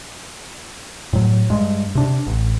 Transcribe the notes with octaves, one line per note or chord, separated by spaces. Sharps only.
A2 F#3
G2 G#3
C3 D4
A1